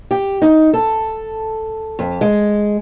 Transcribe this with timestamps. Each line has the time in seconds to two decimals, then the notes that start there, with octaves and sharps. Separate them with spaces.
0.11 G4
0.42 D#4
0.73 A4
1.99 F2
2.21 G#3